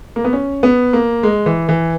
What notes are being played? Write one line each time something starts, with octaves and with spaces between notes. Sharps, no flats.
A#3
B3
C#4
B3
A#3
G#3
E3
E3